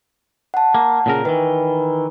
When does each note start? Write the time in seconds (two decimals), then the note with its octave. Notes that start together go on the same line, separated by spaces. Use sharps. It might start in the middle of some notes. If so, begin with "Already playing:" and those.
0.54 F#5 A5
0.75 A#3
1.06 A#2 C#3 A#4
1.25 D#3 E3 B4